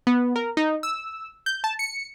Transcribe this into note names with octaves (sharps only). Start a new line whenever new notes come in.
B3
A#4
D#4
E6
G6
A5
C#7